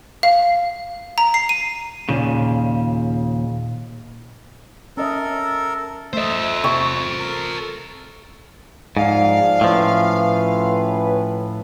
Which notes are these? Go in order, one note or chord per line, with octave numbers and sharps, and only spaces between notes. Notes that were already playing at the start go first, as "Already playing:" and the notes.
F5
A#5
C7
D#7
D#2 A#2 C#3 F4
C#4 A4 A#4 D#5 E5
A3 A4 C5 D#5 E5
C3 C#6
A#4
G#2 F3 D5 F5
A2 F3 A3 C#4 B4